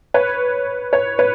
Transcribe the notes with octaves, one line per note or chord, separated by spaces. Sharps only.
B4 C#5
B4 C#5
B4 C#5